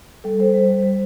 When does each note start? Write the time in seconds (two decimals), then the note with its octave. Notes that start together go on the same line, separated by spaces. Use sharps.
0.24 G3 A4
0.39 G3 C5
0.54 G3
0.70 G3
0.84 G3